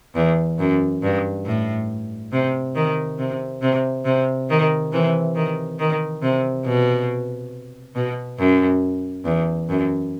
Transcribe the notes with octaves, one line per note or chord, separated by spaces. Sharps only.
E2
F#2
G2
A2
C3
D#3
C3
C3
C3
D#3
C3 E3
D#3
D#3
C3
B2
B2
F#2
E2
F#2